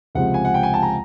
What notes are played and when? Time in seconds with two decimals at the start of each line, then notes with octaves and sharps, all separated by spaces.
0.15 C#2 C3 F3 G#3 F#5
0.34 G#5
0.45 F#5
0.54 G5
0.63 G#5
0.74 A5
0.83 A#5